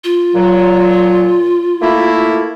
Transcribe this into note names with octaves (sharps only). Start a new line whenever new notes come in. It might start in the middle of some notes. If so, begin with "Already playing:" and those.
F4
A#2 F#3
A3 A#3 E4